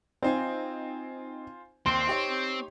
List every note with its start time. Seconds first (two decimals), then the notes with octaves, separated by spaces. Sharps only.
0.22 C4 D#4 F4 C5 G#5
1.86 D#2 C4 C6
2.07 D#4 G4 C#5